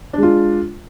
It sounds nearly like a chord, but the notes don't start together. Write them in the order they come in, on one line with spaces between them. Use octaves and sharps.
D4 G#3 F4